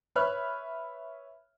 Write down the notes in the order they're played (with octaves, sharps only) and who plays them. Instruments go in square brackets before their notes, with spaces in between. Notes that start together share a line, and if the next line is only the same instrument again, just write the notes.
[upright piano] B4 C#5 E5 B5 F6 F#6